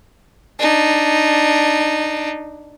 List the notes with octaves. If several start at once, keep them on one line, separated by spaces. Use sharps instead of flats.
D4 D#4